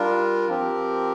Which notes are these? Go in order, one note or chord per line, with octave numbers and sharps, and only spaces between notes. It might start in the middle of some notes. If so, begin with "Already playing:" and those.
Already playing: G3 D4 F4 A#4
F3 C4 G4 A#4